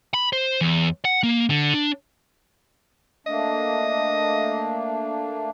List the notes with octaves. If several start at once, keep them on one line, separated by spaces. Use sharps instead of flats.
B5
C5
E2
F#5
A#3
D3
D4
A3 A#3 D4 D#5